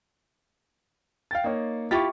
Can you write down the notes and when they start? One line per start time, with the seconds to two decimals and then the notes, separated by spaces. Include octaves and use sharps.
1.31 F5 G5 A6
1.44 A#3 D#4 C#5
1.91 E4 F4 G4 C#6 A6